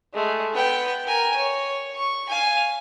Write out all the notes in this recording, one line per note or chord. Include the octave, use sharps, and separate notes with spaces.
G#3 A3
B3 G5
A#4 G#5
C#5
C#6
F5 G#5